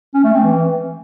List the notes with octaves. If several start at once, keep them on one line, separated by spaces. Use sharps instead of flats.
C#4
A3
C4
E3